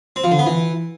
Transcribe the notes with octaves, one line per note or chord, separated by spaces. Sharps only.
C4
F3
D3
B3
E3